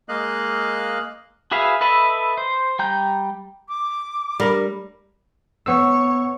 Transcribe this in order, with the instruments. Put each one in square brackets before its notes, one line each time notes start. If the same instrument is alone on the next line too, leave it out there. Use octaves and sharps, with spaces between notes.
[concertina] G#3 A#3 D#5 F5 F#6
[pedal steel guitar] F#4 G#4 B4 E5 F5
A4 B4 D#5 E5 B5
C5
G3 G5 A#5 G6
[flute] D6
[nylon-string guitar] G3 [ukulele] D4 A#4
[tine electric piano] B3 E6 [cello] C#5